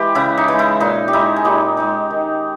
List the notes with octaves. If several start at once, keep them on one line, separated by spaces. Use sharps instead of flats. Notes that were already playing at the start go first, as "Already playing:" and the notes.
Already playing: E3 G#3 G4
C#3 E4
D#4
E3 G#3
E4
A#2 D#4
G4
G#3 D#4 E4
G#4
A#2 D#4 G4
G#3 D#4
D#3